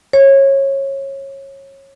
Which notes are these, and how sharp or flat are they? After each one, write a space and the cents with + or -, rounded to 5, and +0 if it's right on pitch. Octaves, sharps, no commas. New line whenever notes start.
C#5 -20